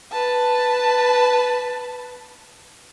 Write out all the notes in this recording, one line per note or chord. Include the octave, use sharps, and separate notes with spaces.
B4 A5